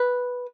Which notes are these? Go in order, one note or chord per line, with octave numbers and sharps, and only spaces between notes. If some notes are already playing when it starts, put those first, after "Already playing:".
Already playing: B4